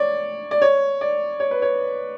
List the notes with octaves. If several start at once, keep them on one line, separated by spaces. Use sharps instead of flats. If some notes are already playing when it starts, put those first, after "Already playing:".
Already playing: C#5 D5
D5
C#5
D5
C#5
B4
C#5